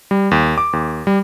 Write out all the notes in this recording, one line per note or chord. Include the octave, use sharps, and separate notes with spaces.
G3
D#2
D6
D#2
G3